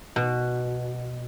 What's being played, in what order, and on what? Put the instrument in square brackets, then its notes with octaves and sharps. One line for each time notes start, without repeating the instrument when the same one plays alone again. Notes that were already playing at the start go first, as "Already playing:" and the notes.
[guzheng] B2